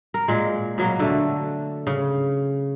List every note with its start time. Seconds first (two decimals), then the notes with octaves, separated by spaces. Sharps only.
0.14 A#4
0.28 A#2 G#3
0.78 B2 F#3 A#3
1.00 D3 A3
1.87 C#3